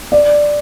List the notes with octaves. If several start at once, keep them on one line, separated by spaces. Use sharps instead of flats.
D5